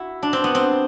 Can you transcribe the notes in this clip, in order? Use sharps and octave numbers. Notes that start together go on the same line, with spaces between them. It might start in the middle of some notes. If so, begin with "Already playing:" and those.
Already playing: E4 F#4
D4
C4
B3
C4